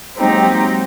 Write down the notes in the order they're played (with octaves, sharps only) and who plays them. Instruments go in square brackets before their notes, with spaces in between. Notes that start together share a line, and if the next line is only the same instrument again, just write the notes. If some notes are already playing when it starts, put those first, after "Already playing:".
[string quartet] F#3 G#3 A#3 C4 D#4 G4